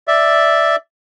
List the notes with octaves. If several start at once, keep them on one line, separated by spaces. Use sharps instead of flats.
D5 E5